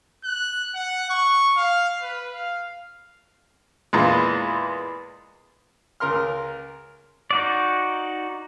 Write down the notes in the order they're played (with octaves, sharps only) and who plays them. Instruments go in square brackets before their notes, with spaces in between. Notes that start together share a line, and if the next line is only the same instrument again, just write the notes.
[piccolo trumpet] F#6
F#5
C#6
F5
B4
F5
[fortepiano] E2 A#2 G#3
C#2 A#4 C6 F6
[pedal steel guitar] D#4 F#4 D5